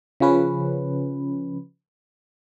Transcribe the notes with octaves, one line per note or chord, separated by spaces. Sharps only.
C#3 F3 C#4 B4